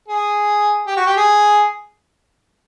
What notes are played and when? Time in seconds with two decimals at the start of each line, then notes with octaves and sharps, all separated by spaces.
0.08 G#4
0.87 G4
0.96 F#4
1.06 G4
1.17 G#4